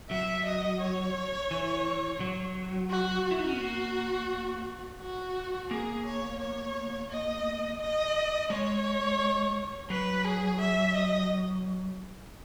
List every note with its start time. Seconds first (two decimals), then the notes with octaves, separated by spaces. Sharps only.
0.10 F#3 E5
0.45 D#5
0.81 C#5
1.51 E3
2.20 F#3
2.90 F#4
3.26 F#4
3.31 E4
3.38 D#4
3.45 C#4
3.53 B3
3.61 A#3
5.01 F#4
5.70 A#3 G#4
6.06 C#5
6.40 C#5
7.10 D#5
7.81 D#5
8.50 G#3 C#5
9.90 F#3 B4
10.25 G#4
10.60 E5
10.95 D#5